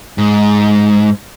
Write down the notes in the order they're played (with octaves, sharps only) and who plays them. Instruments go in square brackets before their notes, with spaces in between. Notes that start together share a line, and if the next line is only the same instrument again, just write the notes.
[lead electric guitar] G#2